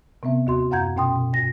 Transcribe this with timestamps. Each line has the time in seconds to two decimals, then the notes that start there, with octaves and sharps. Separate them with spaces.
0.23 C3 B3 C4 E5
0.47 D#2 F#4 C6
0.71 F#2 F5 F#5 A#5 G6 G#6
0.96 B2 C#4 G5 C6 D#6
1.16 B2
1.33 G2 A#6